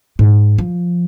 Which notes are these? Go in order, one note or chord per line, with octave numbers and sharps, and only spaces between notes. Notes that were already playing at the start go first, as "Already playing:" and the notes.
G#2
F3